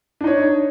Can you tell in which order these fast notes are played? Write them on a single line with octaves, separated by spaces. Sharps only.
D4 D#4 C#5